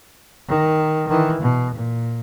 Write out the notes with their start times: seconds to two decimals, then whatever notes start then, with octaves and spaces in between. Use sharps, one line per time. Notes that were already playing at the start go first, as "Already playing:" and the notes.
0.48 D#3
1.08 D#3 E3
1.41 B2
1.75 A#2